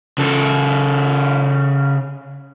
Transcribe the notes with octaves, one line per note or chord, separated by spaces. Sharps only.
C#3 A4